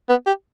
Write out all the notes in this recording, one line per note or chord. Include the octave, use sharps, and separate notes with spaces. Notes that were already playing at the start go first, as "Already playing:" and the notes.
B3
G4